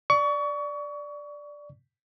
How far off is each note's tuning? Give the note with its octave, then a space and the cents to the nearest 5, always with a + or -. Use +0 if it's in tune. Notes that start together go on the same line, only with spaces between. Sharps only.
D5 +0 C#6 +30